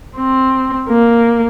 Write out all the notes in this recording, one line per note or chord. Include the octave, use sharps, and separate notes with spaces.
C4
A#3